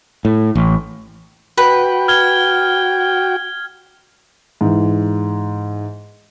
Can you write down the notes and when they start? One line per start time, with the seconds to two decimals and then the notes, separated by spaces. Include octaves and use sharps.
0.25 A2
0.55 A1
1.58 F#4 B4 G5
2.08 F6 G#6 G7
4.61 G#2 E3